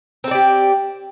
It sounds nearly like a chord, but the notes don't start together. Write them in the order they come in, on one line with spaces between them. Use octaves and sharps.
C4 A4 D5 G4